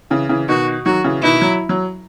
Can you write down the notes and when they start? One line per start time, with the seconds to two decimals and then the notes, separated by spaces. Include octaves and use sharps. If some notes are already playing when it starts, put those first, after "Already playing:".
0.10 C#3 E3
0.29 C#3 E3
0.48 B2 D#3 F#4
0.85 D#3 F#3 F#4
1.04 C#3 E3
1.23 B2 D#3 E4
1.42 F#3
1.69 F#3